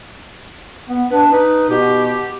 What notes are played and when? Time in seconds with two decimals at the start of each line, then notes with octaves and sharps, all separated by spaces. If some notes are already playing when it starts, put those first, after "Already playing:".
0.87 B3
1.10 D4 B4
1.31 D#4 B4
1.69 B2 G4